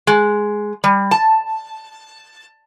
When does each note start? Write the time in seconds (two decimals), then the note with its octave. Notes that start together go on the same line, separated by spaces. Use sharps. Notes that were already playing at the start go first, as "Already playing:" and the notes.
0.07 G#3
0.84 G3
1.11 A5